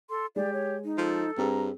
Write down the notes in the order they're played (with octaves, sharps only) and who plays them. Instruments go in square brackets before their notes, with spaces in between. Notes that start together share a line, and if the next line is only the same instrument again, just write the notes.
[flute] A4 [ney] C6
[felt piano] G#3 [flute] G4 [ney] D5
[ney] C#5
D#4
[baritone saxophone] F3 [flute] A4
[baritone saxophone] G2 [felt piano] C4 G#4 [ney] A#5